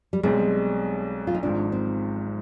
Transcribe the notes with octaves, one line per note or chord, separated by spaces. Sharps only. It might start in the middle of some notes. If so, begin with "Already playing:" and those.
G3
B1 B2 G3 G#3 C4
F4
D#4
G#1 G#2 F3 D4
C4